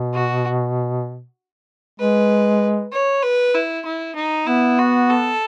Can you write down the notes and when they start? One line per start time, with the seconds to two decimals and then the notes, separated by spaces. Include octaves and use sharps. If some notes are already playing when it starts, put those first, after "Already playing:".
Already playing: B2
0.14 F#4
2.00 G#3 B4
2.93 C#5
3.23 B4
3.55 E4
3.85 E4
4.16 D#4
4.47 B3 E4
4.79 F#4
5.10 A4